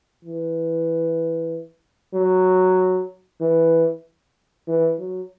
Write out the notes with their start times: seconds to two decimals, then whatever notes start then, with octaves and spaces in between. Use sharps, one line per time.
0.25 E3
2.14 F#3
3.41 E3
4.68 E3
4.99 F#3